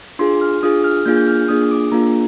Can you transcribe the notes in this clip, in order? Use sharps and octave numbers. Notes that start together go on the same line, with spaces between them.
D4 F4 G#4 C6
F6
D4 F4 G#4 D#6
F6
A#3 D4 F4 G#4 G6
G6
F6
A#3 D4 F4 G#4 D#6
D6
A#3 D4 F4 G#4 A#5